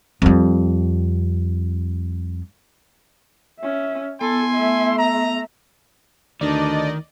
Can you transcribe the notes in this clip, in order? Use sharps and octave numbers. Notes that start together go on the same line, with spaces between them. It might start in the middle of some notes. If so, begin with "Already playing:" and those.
F2 G3
C#4 E5
B3 E4 A4 G#5 C6
A3 E5
A#5
D2 D#3 D4 D5 D#5